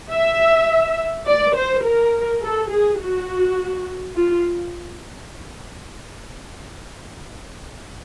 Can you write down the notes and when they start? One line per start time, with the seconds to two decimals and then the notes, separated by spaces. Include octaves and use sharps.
0.11 E5
1.26 D5
1.55 C5
1.84 A#4
2.42 A4
2.70 G#4
2.99 F#4
4.15 F4